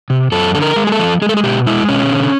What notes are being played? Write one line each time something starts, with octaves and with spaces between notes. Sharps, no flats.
C3
F#2 A4
D3 A4
A#4
G#3
G#4
A4
F3
G#3 G#4
A4
G#4
B2 G4
G#3 E4
B2 C#4
D3